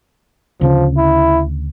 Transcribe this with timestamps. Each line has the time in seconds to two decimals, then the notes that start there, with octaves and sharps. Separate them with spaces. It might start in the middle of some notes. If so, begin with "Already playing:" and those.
0.61 D2 C#3 F3 C#4
0.98 E4